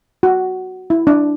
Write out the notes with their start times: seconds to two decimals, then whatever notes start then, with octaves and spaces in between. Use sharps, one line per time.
0.23 F#4
0.90 E4
1.07 D4